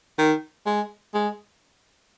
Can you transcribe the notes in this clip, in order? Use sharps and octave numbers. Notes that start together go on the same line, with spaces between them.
D#3
G#3
G#3